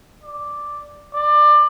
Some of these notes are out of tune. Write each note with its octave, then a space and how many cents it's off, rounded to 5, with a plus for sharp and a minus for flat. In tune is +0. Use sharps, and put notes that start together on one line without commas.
D5 +0
D5 +25